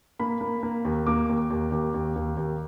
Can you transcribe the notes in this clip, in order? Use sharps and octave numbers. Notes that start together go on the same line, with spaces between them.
A#3 B5
A#3
A#3
D#2
A#3 D6
D#2
D#2
D#2
D#2
D#2
D#2